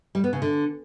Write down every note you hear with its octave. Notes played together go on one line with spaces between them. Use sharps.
G3
B3
C#3
D3